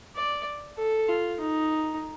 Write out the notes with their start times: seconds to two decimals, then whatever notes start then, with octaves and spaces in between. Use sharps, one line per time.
0.16 D5
0.78 A4
1.08 F4
1.40 D#4